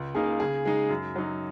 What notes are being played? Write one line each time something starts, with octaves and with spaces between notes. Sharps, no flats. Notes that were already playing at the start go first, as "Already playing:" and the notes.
Already playing: C#2
C#3 A#3 D#4 G#4
C#3 G#4
G#3 D#4
F#2
F#3 D#4